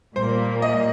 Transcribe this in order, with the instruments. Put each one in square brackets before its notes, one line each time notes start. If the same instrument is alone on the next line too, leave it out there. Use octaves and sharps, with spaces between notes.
[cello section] A#2 G3 A#3 [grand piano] C5
[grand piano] D#5